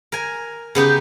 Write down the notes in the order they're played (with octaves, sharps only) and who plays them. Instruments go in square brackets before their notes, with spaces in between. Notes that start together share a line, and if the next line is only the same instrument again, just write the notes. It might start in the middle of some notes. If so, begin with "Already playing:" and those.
[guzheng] A#4 G#5
C#3 B3 D#4 G4